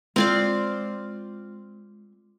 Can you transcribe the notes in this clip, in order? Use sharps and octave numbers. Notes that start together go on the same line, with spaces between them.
G#3 C4 F4 D5